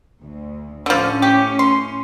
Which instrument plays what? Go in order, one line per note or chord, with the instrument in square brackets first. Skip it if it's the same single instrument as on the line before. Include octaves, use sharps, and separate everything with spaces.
[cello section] D2
[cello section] A2 C#4 [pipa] D3 F3
[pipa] G4
C6